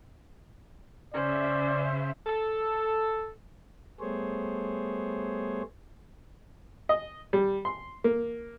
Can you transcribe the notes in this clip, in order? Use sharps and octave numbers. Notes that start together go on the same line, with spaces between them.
C#3 C#4 C5 D5 E5
A4
G3 A3 B3 G#4 C5 C#5
D#5
G3
C6
A#3